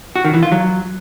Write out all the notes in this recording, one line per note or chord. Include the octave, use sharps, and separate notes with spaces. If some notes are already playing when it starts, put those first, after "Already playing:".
F#4
D#3
E3
F4
F#3